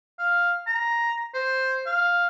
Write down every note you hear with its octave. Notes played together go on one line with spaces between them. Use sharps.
F5
A#5
C5
F5